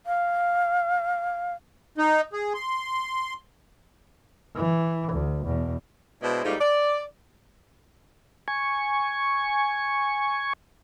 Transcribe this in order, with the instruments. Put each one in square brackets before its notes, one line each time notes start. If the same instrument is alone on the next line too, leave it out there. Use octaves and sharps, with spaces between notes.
[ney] F5
[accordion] D#4
G#4
C6
[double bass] E3
D2
E2 B2
[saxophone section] B2 G#3 D4 E4 C5 D#5
G#2 G3 A3 A#3 D#4 F4
D5
[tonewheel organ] G#5 C#6